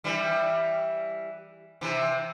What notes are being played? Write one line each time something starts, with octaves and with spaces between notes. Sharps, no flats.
E3 G3
C3 E3